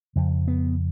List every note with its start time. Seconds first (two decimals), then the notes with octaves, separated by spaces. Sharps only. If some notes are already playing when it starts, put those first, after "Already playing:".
0.16 F2 C#3
0.48 B3